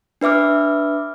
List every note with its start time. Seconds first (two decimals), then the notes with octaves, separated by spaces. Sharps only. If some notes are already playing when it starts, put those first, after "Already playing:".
0.21 D4 B4 E5 D6 F6